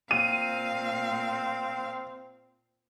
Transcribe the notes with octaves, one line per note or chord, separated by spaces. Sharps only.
A#2 C4 F5 D#7